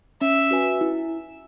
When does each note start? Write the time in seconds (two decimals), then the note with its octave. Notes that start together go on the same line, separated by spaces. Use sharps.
0.21 C#4 E5
0.51 F#4 B4 G#5
0.81 E4